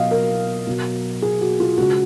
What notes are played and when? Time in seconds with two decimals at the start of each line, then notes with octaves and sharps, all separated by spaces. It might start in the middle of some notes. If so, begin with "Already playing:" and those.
Already playing: B2 F#3 D#5 F5
0.11 A#4
0.67 B2 F#3
1.22 G#4
1.41 F#4
1.60 F4
1.78 C#3 G#3 F#4